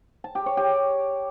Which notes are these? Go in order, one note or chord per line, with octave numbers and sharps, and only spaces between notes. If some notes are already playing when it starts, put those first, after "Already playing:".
A5
G4
C#5
G4